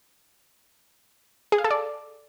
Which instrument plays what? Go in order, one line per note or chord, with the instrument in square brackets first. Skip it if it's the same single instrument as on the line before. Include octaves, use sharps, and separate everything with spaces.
[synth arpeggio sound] G#4
F5
A4
D5